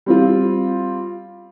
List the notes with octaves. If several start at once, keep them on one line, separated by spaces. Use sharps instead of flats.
G3 C4 F4